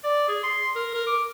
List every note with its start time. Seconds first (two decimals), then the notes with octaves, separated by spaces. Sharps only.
0.04 D5
0.28 G#4
0.44 C6
0.76 A#4
0.94 A#4
1.07 D6